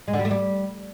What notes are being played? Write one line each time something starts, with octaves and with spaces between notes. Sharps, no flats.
G#3
D3
G3
A3
G3